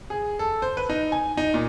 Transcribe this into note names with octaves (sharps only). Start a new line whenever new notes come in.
G#4
A4
C5
B4
D#4
G#5
D#4
A#2